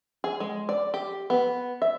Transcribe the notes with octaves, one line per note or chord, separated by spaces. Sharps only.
G#4
G#3
D5
G4
B3
E5